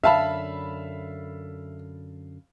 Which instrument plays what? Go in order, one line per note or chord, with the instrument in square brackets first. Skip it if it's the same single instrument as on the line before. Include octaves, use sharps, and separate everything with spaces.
[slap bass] F#2 D3 [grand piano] E5 [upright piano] F5 A5 B5